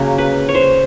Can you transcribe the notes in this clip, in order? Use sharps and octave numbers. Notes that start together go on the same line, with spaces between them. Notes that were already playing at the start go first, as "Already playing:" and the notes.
Already playing: C#3 F#3 A#3
B4
C#5
C5